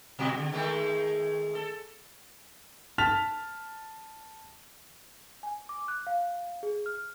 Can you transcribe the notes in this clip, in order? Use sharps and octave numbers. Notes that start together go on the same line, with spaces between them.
B2 G3 F#4
D3
D#3 G#3 A3
A4
A5 F6 A6 B6 F7
G#5
D6
F#6
F5
G#4
F6